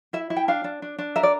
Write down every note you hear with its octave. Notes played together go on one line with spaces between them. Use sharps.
E4 E5
E4
G5
D4 F5
D4
D4
D4
A#4 E5
D5